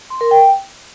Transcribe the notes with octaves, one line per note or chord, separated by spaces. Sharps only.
C6
A#4
G5